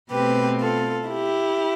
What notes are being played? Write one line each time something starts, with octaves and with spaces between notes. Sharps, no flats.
B2 A3 C4 G4 B4
F4 A4
E4 G4